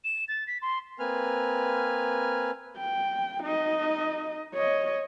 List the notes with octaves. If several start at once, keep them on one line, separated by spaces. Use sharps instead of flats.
E7
A6
B6
C6
A#3 C4 B4 G#5 F6
G5
D#4 D#5
C#5 D#5